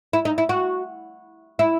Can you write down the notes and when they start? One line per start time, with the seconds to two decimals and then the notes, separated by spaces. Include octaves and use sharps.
0.13 E4
0.25 D#4
0.38 E4
0.49 F#4
1.59 E4